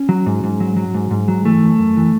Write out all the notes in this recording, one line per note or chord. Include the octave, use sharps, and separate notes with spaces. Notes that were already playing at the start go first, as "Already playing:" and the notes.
Already playing: C#4
F#3
G#2
G#2
F#3
F#3
G#2
G#2
F#3
E3 A3
F#2
F#2
E3